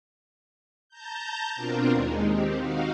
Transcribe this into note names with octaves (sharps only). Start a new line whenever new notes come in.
A5 A#5 G6
B2 C4 D4 F4 A#4
D#2 G#3 D#4
D#3 C4 G4
D#4 F#4 F5